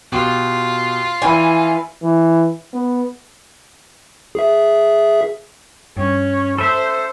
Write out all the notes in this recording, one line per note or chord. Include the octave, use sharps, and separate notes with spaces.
B2 F4 G4 D6
E3 G5 G#5 B5
E3
B3
G#4 E5
G2 C#4
A4 C5 E5